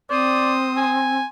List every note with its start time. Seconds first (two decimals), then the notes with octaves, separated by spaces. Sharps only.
0.10 C4 C5 D5 D#6
0.77 G#5